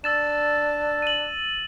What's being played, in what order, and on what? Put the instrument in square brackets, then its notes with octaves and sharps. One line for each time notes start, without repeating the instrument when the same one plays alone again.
[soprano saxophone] D4 [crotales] E6 A6 E7
[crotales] D#7 F#7